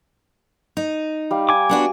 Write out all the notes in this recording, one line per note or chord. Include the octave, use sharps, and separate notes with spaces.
D#4
G3 F5
G#5 D6
B3 D4 F#4